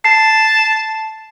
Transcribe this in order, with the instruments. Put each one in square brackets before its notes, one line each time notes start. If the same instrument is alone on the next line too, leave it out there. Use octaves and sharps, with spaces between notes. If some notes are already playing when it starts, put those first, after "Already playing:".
[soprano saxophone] A5 [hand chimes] C7